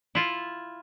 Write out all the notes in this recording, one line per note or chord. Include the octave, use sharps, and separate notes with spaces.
E4 F4